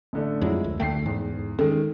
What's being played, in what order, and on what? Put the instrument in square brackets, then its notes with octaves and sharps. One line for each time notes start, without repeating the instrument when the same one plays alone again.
[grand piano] A1 D3 A3
[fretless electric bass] F2 F#3 [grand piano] F3 G#3 E4
[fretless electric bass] D2
[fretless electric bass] D2 D3 A3 [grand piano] G5 C7
[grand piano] E2 [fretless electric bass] G#2
[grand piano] D#3 G#3 [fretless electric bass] C#4 [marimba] A4